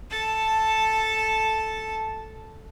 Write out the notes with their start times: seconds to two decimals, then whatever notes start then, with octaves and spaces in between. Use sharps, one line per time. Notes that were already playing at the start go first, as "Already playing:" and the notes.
0.11 A4 A5